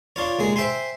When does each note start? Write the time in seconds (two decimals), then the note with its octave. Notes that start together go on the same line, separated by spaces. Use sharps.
0.16 D4 F4 C#5
0.39 D#2 G#3 G#4
0.56 C5 E5 G5 G#5 C6